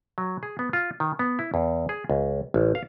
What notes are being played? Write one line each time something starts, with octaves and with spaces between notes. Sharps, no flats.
F#3
G#4
B3
F4
D#3
B3
E4
E2
G#4
C#2
A1
F5